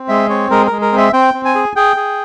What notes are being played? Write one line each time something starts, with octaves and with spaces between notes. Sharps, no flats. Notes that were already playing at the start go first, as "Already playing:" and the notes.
Already playing: C4
G#3 E5
C4 C#5
G#3 A#4
G#3 A#4
A#4
C4
E5
C4 G5
C4
G#5
G#4
G#4 G5
G#4